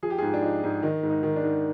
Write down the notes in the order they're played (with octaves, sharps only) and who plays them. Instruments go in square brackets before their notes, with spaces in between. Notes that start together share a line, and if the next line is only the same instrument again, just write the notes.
[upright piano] F3 G#4
G4
F4 G#4
G#2
D4
F3 D#4
G#2
D#3 D#4
G#2
D#4
D#3
D4
G#2